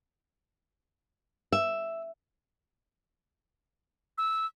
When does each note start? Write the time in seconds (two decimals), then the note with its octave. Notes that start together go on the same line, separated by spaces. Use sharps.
1.52 E5
4.18 E6